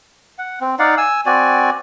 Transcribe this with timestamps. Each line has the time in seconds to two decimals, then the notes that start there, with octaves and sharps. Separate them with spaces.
0.38 F#5
0.61 C4
0.79 D#4 D5 F5 F#5
0.98 G#5 E6
1.26 C4 F#4 D5 G#5